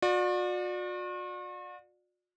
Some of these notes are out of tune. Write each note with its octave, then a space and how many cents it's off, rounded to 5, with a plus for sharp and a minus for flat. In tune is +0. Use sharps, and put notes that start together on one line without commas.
F#4 -45 D5 +20